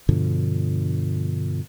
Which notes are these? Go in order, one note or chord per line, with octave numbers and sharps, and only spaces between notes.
G2 B2 D3 F3